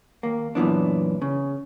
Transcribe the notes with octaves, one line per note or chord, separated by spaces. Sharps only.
D#2 A#3
F#2 A#2 E3 B3 D4
C#3